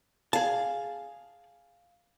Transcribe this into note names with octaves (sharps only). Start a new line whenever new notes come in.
G#4 F5 A5